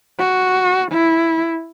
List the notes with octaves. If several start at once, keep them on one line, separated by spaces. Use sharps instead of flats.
F#4
E4